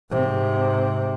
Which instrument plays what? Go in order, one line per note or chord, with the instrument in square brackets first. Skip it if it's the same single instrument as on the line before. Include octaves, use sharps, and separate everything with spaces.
[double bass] G#2 C3